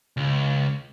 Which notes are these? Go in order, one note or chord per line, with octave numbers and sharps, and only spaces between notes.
C#2